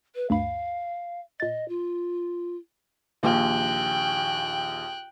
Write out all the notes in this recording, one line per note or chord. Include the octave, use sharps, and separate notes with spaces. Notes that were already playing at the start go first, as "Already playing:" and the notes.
B4
D2 G2 F5 B5
A#2 D#5 A6
F4
A#1 D#2 G5 F#6